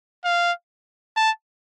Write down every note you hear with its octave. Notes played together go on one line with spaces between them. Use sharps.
F5
A5